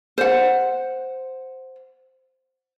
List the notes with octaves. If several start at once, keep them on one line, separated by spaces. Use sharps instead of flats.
C5 F#5